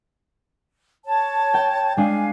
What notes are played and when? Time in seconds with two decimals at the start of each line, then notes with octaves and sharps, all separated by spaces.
1.06 C#5 A5
1.54 G5
1.97 G#3 D4 F5 G#5